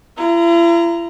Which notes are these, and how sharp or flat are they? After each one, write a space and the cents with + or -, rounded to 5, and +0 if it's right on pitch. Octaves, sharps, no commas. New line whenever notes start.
E4 +45 A#5 +0